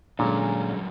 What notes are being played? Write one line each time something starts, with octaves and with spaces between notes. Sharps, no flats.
G2 A#2 D3 F#3 G#3 C#4